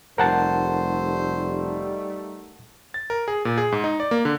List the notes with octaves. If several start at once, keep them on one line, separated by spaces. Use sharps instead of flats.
F1 G3 A3 D#4 A#4 C5 F#5 A5
A6
A#4
G#4
A#2
G#4
G#2
D#4
D5
A#3
D3